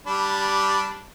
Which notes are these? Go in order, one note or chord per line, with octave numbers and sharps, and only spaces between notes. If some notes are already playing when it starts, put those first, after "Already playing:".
G3 D4 B5